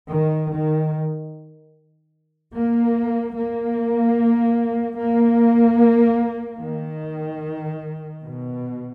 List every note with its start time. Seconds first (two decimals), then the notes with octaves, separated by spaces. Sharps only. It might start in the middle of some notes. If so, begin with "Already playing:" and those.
0.12 D#3
0.52 D#3
2.54 A#3
3.35 A#3
4.98 A#3
6.60 D#3
8.23 B2